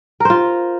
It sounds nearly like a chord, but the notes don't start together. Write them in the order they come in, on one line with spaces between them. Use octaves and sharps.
A#4 C5 F4